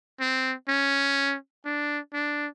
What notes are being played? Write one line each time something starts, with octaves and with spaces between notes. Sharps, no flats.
C4
C#4
D4
D4